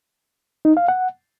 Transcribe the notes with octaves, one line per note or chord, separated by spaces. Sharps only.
D#4
F5
F#5